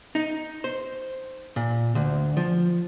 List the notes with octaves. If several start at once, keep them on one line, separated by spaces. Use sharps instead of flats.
D#4
C5
A#2
D2
F3